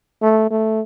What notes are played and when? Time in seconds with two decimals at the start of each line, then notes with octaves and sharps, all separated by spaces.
0.22 A3
0.51 A3